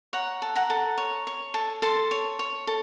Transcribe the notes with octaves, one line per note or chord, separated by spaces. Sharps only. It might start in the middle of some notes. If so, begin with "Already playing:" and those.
C#5 F#5 A#5
A4
F#5 A#5
A4
C#5
C#5
A4
A4 A5 C6
C#5
C#5
A4